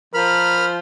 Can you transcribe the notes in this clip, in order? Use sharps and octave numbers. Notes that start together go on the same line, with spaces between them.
F3 A#4 B5 F6